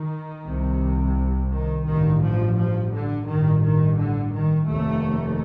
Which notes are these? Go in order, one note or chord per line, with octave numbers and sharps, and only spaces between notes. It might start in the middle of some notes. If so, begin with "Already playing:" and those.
Already playing: D#3
C2 C3
D#3
A1 G2 D#3
F3
F3
D3
A1 G2 D#3
D#3
D3
D#3
F1 D#2 A3